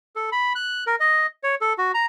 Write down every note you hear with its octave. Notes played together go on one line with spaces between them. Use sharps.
A4
B5
F#6
A#4
D#5
C#5
A4
F#4
A#5